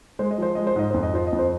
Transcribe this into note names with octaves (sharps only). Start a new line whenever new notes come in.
G#3 C5
D#5
F3 C5
G#3 D#5
C5
G#2 D#5
F2 C5
D#5
F3 C5
D#5
F2
C4 C5